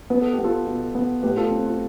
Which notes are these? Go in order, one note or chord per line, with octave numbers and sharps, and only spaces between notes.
B3 B4
A4
G4
B3
F4 A4
B2
B3
A2 G4 B4
F4 A4
C4
F4